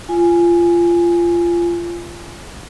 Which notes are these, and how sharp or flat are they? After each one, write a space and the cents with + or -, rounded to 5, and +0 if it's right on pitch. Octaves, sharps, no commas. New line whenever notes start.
F4 -20 G#5 +0